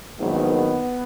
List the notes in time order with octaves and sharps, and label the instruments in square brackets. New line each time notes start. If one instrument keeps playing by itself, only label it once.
[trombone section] A#1 G#2 D#3 F#3 B3